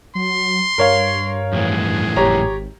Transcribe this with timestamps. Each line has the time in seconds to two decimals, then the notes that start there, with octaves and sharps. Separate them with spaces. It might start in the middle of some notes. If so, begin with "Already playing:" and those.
0.15 F#3 C6
0.78 G2 A#4 C#5 F5
1.53 F2 A2 E3 G#4
2.16 G#1 G4 C#5 A#5